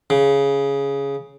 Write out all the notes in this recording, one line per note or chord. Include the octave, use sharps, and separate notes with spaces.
C#3